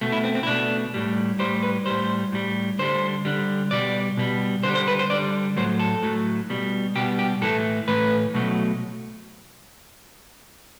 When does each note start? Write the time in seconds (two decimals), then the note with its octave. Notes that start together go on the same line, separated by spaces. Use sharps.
0.01 B2 A3
0.12 E4
0.24 C4
0.35 C4
0.43 E4
0.47 B2 A3 D4
0.94 A2 G3
1.39 A2 G3 C5
1.63 B4
1.86 A2 G3 C5
2.32 A2 G3
2.79 D3 G3 C5
3.25 D3 G3
3.71 B2 G3 D5
4.17 B2 G3
4.63 D3 G3 C5
4.75 C5
4.88 B4
4.99 C5
5.10 D3 G3 D5
5.56 A2 F#3 A3 C5
5.80 A4
6.03 A2 F#3 A3
6.50 B2 G3
6.95 B2 G3 G4
7.19 G4
7.42 A2 E3 A3 A4
7.88 A2 E3 A3 B4
8.34 B2 F#3 A3